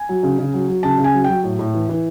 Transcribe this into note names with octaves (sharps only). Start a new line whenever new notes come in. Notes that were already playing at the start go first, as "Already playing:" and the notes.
Already playing: G#5
F#3
C#3
C#3
F#3
F#3
C#3 A5
C#3
G#5
F#3
F#3 G5
A2
A2
E3
E3